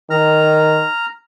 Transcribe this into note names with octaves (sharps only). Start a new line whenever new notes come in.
D#3 A#5 F6